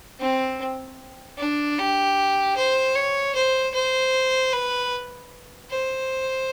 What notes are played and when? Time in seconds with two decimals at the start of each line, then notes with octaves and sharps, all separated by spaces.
0.20 C4
1.38 D4
1.78 G4
2.56 C5
2.95 C#5
3.35 C5
3.74 C5
4.52 B4
5.70 C5